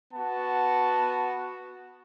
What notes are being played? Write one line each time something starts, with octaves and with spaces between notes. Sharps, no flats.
B3 F#4 A5